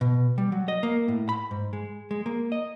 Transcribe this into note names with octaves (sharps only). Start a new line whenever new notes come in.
B2
G3
F#3
D#5
A#3
A2
B5
G#2
G#3
G#3
A#3
D#5